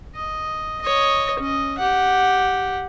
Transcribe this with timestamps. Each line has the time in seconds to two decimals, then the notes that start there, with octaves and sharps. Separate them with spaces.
0.15 D#5
0.81 C#5 D#5
1.39 C#4 D#5
1.78 G4 F#5